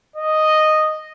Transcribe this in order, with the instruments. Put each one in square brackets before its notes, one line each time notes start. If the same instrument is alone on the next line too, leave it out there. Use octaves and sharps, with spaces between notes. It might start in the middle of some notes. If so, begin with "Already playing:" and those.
[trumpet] D#5